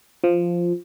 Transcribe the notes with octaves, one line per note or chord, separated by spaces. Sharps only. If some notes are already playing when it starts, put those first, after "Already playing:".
F3